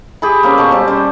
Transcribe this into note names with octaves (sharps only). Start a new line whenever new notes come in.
G4 G#4 B5
A#3 C4 C#4
B2 A5 C#6
G3 C4
C#4 C5